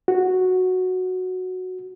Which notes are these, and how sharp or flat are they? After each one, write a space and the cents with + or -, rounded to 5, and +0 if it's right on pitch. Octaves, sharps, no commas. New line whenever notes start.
F#4 -5